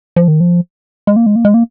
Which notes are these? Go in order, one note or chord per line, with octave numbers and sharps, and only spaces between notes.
F3
D#3
F3
G#3
A#3
G#3
A#3
G#3
A#3